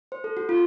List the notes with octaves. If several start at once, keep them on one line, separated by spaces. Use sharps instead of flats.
C5
A4
F#4
F4